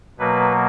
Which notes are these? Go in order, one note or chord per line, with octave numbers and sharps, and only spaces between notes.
B2 F#3 A#3 B4